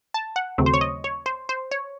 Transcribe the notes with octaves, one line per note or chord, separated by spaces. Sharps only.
A5
F#5
D#2 C#3 F#3 A3 C4
C5
C#5
D#5
C#5
C5
C5
C#5